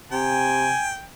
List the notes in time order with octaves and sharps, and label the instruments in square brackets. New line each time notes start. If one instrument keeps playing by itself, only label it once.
[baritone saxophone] C3 [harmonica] G5 [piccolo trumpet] G#5